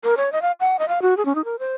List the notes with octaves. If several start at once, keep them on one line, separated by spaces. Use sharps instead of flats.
A#4
C#5
D#5
F5
F#5
D#5
F5
F#4
G#4
C#4
D#4
A#4
C5